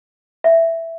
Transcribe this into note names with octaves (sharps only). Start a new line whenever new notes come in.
E5